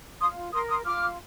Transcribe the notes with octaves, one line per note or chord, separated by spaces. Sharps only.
F4 C6 D#6
A#4 C6 D#6
C6 D#6
F4 D6 F6